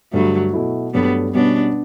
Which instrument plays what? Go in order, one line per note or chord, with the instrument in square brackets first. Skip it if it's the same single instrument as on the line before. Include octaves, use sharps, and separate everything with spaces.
[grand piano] G2 D3 G3 D4 [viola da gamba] F#3 A3
[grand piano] B2 A3 E4
[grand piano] G2 F#3 A3 [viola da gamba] G3 B3
[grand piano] B2 G3 C#4 [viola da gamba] B3 D4